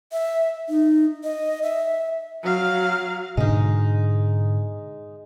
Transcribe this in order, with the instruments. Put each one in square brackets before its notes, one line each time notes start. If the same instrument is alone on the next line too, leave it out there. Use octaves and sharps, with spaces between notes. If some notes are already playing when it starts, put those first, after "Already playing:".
[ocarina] E5
D#4
D#5
E5
[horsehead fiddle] F#3 F5
[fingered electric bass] G#2 B2 D3 [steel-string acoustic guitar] G#3 D#4